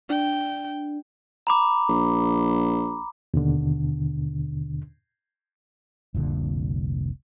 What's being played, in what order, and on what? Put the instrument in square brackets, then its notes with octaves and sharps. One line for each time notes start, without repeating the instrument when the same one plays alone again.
[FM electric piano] D4 [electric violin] G5
[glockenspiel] A#5 B5 D6
[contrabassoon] A#1
[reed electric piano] D#2 B2 D3
[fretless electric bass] F1 C2 A#2 D3